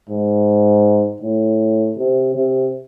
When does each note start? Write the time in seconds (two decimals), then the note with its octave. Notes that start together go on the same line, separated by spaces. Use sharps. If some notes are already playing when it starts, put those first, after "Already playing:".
0.10 G#2
1.22 A2
1.97 C3
2.35 C3